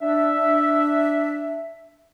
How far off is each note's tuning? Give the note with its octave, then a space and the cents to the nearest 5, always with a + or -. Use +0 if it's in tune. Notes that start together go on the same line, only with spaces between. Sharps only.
D4 +0 E5 +0